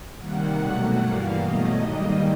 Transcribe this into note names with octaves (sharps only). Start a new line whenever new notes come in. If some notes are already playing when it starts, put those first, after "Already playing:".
C3 D#3 G3 A#3 F#5
B2 F#3 A3 F#5
G2 E3 G3 A#3 F5
B2 F#3 A3 D#5
G#2 D#3 G3 A#3